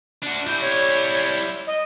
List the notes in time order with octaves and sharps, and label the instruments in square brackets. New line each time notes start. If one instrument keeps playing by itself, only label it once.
[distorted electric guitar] D4 F#4
[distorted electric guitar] G3 E4 [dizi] G6
[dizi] C#5
D#5